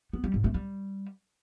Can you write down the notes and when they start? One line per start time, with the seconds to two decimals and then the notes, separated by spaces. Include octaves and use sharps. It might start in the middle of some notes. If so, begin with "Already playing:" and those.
0.13 B3
0.24 G3
0.34 G#2
0.44 A3
0.55 G3